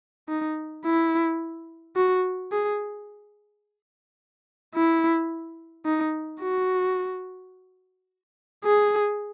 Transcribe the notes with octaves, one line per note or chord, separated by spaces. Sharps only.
D#4
E4
F#4
G#4
E4
D#4
F#4
G#4